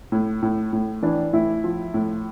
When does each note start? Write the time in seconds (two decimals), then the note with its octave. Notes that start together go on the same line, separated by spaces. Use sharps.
0.12 A2
0.42 A2
0.73 A2
1.03 E3 D4
1.33 A2 E4
1.64 F3
1.94 A2